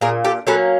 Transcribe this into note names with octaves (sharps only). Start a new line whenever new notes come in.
A#2 G#4 A#4
G4 A4
F#3 A#3 C#4 A4 B4